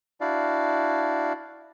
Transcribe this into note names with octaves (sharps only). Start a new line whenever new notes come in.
D4 E4 F#4 D5 F5